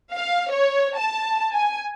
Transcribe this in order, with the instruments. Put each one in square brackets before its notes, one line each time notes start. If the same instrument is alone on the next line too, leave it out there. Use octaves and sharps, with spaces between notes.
[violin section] F5
C#5
A5
G#5